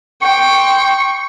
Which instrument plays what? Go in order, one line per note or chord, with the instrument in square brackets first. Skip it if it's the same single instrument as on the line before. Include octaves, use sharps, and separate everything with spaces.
[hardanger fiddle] G5 [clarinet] C#6